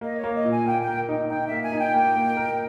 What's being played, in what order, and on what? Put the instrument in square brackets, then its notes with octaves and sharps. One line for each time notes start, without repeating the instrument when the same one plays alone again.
[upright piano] A#3 [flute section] D#5
[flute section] C#5
[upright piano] A#3
[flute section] D#5
[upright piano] A#2
[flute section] G#5
[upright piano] A#3 [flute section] G5
[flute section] G5
[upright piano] A#4
D#4
[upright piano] D#4 [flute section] G5
[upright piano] A#3 [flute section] E5
[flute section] G#5
[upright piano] D#4
[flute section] G5
[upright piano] A#3
A#3
A#4